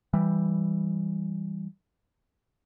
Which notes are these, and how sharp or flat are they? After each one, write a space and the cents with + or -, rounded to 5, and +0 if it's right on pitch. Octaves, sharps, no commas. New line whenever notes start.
E3 +0 G3 +0